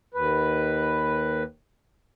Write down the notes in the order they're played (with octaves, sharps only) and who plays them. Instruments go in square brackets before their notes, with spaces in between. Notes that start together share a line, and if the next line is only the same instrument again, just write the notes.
[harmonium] D#2 B4